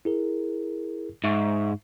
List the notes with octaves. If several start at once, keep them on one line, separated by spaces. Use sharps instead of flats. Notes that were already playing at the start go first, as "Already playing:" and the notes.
E4 G#4 A#4
G#2 E5 C#6